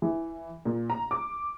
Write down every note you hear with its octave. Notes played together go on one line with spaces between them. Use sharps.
E3
A#2
A#5
D6